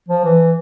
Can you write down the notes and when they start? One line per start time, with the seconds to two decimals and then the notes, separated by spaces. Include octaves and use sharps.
0.08 F3
0.24 E3